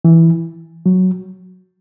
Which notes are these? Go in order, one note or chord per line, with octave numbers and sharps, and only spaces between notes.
E3
F#3